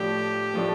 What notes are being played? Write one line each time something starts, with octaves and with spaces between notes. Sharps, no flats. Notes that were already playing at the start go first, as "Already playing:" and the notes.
Already playing: A2 F3 A3 D4 G4
A2 F3 A3 D4